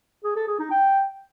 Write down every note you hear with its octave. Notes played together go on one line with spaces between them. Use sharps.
G#4
A4
G#4
D#4
G5